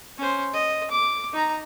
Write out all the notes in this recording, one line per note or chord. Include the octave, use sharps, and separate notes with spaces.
C#4 C5
D#5
D6
D#4 A#5